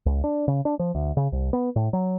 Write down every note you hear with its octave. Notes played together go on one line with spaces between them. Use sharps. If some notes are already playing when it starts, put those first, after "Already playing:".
C#2
D4
C#3
D4
F3
D2
C#3
C2
B3
A2
F#3